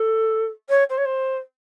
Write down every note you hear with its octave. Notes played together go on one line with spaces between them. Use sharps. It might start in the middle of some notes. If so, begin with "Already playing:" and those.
Already playing: A4
C#5
C5
C#5
C5